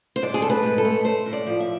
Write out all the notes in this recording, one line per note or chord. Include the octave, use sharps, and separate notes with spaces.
C5
G#2 D5
G#4
A3 A4
B4
G#2
A4
A3
A3 C5
A2
D5
F3
E5